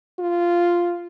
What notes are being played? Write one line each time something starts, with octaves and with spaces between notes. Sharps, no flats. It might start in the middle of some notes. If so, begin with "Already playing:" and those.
F4